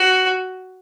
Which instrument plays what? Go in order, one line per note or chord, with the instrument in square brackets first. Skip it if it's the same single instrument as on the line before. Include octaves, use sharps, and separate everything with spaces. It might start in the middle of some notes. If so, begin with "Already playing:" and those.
Already playing: [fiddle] F#4